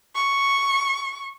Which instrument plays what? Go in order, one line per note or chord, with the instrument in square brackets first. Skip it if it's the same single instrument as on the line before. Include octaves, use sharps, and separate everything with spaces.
[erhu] C#6